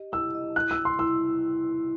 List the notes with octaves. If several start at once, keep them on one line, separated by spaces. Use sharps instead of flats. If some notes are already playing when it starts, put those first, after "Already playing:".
Already playing: G4 D#5
E4 E6
D#5
E4 F#6
E6
E4
C6
E4 E6